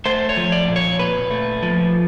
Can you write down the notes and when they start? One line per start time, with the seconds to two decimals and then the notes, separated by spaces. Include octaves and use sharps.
0.05 A3 C5
0.29 C#5
0.37 F3
0.52 D5
0.68 A#2
0.76 C#5
0.99 A#2 B4
1.31 A3
1.63 F3